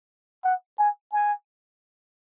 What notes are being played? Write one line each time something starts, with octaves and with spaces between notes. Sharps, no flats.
F#5
G#5
G#5